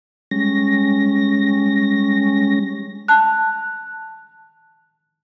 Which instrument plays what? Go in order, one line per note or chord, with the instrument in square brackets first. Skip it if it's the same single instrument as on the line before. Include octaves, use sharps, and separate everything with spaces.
[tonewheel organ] G3 G#3 C#4 A#6
[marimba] A5 F#6